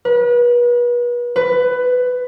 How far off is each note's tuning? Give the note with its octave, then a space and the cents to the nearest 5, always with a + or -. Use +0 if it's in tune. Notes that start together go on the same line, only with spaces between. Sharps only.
B4 -35
B4 +15